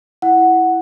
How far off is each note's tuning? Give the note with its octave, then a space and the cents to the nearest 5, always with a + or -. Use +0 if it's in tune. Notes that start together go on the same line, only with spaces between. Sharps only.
E4 +0 F#5 +0